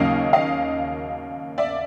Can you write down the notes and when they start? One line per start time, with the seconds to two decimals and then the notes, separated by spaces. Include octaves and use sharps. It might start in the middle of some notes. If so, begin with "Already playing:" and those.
Already playing: D#2 C#3 F#3 A#3 C#4 D#5 F5
0.33 D#5 F5
1.58 D5 E5